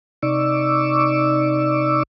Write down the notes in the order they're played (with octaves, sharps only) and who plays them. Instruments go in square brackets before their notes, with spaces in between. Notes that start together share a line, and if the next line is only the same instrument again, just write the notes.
[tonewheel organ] C3 D#4 D5 C#6 D6 E6